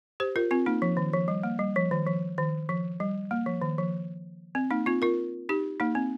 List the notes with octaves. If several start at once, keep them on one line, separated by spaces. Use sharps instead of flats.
G4 C5
F4 A#4
C4 F4
A#3 D#4
F3
D#3
F3
G3
A#3
G3
F3
D#3
F3
D#3
F3
G3
A#3
F3
D#3
F3
C4
A#3 D#4
C4 F4
F4 A#4
D#4 G4
A#3 D#4
C4